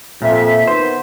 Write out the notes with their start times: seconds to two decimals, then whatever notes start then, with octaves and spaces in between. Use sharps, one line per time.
0.22 F2 A#2 E5
0.68 D#3 B3 C5